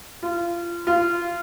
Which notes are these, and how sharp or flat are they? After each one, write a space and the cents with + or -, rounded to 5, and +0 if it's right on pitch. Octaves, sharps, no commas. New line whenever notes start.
F4 -25
F4 -20